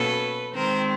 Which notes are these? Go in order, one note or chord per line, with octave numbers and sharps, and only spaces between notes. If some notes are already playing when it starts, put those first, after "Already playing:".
Already playing: B2 F#3 A#3 C#4 A4 B4
D#3 G#3 C4 A#4 C5